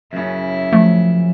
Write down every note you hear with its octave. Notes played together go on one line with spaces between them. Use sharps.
F#2 C#3 E4
F3 A3